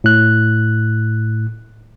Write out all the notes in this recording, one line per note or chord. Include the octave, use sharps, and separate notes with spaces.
A2 F#6